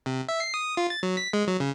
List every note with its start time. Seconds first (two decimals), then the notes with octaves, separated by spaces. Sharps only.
0.06 C3
0.29 E5
0.40 C7
0.54 D#6
0.77 F4
0.90 A6
1.03 F#3
1.17 B6
1.33 G#3
1.47 F#3
1.60 C#3